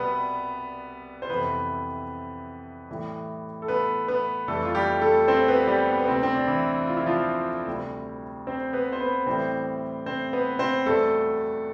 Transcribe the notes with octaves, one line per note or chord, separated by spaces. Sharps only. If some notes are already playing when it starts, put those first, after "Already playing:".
Already playing: C2 B2 G3 B3 B4
C5
F2 C3 E3 B3 B4
A2 E3 G3
A4
B3 B4
B3 B4
F2 E3 G3 A3 A4
F4
G3 G4
A3 A4
C4 C5
B3 B4
G3 G4
B3
B3
D2 C3 G3 C4
C4
D4
E3 E4
F4
E4
F3 F4
D2 C3 G3
C4 C5
B3 B4
C5
B3 B4
A2 E3 G3 C4 C5
C4 C5
B3 B4
C4 C5
E2 B2 G3 A3 A4